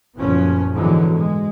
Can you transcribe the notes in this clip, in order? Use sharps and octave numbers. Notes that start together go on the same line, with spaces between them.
F#1 A#2 F3 B3 C#4
G#2 B2 D3 E3 F#3
G#3